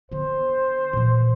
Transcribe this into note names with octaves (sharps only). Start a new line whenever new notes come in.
D3 B3 C5
A#2 E3